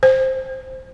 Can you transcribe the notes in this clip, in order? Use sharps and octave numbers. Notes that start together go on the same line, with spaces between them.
C5